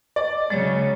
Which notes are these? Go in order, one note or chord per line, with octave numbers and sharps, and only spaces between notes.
D5
C#3 F#3 G#3 C#5 A6